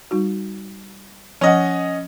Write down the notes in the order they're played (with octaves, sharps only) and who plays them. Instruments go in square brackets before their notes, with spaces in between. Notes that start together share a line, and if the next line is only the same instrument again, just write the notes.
[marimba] G3 D#4 F#4
[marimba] F3 [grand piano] C#4 D#5 F#5